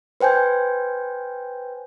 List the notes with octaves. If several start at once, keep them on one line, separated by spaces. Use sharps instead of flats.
B4 C5 G5 G#5 G6